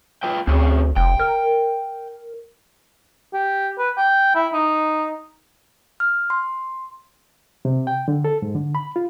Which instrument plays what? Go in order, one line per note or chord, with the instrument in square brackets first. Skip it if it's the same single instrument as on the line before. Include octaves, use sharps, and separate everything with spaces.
[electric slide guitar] F4 B4 G5
[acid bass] D2 [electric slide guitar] C4 C#4 G#4
[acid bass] F1 [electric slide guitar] G5
[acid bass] A#4
[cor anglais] G4
B4
G5
E4
D#4
[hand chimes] F6
C6
[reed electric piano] C3
G5
D3
A4
G#2
D3
B5
F4